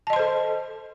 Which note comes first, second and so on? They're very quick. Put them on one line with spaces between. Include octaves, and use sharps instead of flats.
A5 D#5 C6 C5 A4